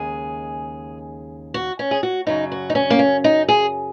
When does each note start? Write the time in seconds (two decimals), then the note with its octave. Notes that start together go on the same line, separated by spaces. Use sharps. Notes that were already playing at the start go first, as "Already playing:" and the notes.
Already playing: D#2 C#3 G#3 G#4
1.54 F#4
1.79 C#4
1.91 G#4
2.03 F#4
2.27 F#2 C#3 F#3 D#4
2.52 F#4
2.70 D#4
2.75 C#4
2.90 A#3
2.99 C#4
3.24 D#4
3.48 G#4